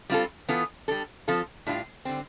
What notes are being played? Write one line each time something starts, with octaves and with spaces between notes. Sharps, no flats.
G3 C4 F4 A4
E3 B3 F4 A4
G3 D4 A4
F3 C4 F4 A4
A2 G3 D4 F4
D3 G3 C4